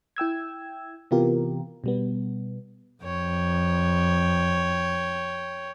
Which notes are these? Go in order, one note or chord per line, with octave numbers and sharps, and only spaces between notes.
E4 G5 E6 G#6
C3 E3 B3 F4 G4 A#4
B2 G3 B3
F2 C#5 G5